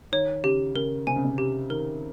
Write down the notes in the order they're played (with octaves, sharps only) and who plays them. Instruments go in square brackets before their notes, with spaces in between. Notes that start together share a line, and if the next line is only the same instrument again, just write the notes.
[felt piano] D#3 [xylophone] C#5
[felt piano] C#3 [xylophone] G4
[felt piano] C#3 [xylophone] A#4
[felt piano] C3 [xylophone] G#5
[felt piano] C#3
C3
[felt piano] C#3 [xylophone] G4
[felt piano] D#3 [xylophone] A#4